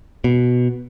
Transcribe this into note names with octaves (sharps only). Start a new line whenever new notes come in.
B2